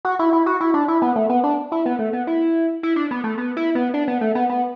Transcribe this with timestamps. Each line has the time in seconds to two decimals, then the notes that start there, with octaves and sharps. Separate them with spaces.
0.05 F#4
0.19 E4
0.33 E4
0.46 F#4
0.60 E4
0.74 D4
0.88 E4
1.02 B3
1.16 A3
1.30 B3
1.44 D4
1.72 E4
1.86 B3
1.99 A3
2.13 B3
2.27 E4
2.83 E4
2.96 D4
3.11 B3
3.24 A3
3.38 B3
3.57 E4
3.75 B3
3.94 D4
4.08 B3
4.21 A3
4.35 B3
4.49 B3